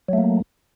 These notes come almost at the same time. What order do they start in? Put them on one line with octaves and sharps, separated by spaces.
F#3 A3 A#3